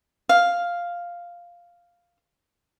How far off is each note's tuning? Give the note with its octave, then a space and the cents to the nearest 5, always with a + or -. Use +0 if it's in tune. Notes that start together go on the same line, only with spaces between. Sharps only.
F5 +0